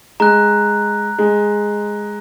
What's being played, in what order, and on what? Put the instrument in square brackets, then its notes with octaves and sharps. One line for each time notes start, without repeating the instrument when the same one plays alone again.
[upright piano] G#3 [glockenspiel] A#5 F#6
[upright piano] G#3